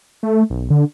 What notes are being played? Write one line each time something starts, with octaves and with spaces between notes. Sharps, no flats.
A3
B1
D3